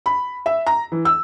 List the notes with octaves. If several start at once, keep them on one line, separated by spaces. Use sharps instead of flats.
B5
E5
A#5
E3
E6